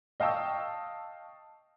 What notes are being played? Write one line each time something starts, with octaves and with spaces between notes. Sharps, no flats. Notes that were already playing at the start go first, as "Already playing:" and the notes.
D#5 F5 G5 A5 C#6 E6